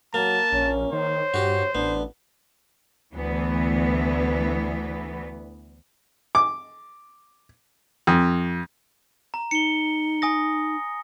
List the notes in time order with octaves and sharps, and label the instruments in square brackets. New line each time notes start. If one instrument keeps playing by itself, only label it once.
[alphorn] F#3 [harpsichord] A#3 [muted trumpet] A5
[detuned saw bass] A#1 [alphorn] C#4
[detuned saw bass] D#3 [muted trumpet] C5 [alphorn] C#5
[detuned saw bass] G2 [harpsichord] F#4 G4
[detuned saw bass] A1 [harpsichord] B3 [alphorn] D4
[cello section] D2 E3 B3
[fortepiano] D6
F2
[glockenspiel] A#5
[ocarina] D#4 [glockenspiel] C#7 G7
[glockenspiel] G#5 D#6 A#6